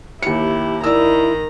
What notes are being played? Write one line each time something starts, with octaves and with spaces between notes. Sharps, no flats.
D#2 E4 G4 C#7
G#1 D#3 E4 D5 A#5 E6